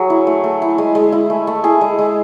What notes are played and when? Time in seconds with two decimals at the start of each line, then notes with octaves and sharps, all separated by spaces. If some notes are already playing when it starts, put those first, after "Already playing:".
Already playing: F#3 G#4
0.10 E4
0.27 A3
0.44 A3
0.62 E4
0.78 G#3
0.95 G#3
1.12 E4
1.30 A3
1.47 A3
1.64 E4 G#4
1.81 G#3
1.99 G#3